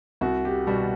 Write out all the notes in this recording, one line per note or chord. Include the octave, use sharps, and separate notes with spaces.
C2 F#4
G4
B2 G3 F#4